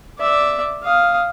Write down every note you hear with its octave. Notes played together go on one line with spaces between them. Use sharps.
D5 E5
F5 D#6